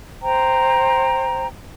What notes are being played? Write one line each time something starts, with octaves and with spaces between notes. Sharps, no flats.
C5 G5 A#5